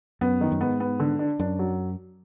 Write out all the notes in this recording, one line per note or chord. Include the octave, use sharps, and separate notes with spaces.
F#2 B3
D#3
F#2
G#2 B3
B3
D3
D4
F#2 D4
F#3